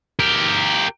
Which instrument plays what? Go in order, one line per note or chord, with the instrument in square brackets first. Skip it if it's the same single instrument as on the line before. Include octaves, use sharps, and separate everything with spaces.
[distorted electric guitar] G4 A#4